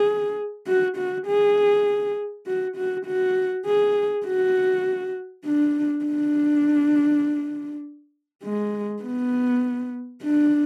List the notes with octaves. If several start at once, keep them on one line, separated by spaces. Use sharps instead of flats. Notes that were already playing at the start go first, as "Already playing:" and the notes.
Already playing: G#4
F#4
F#4
G#4
F#4
F#4
F#4
G#4
F#4
D4
D4
G#3
B3
D4